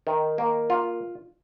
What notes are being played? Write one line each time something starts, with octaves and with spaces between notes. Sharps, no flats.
D#3
A#3
F4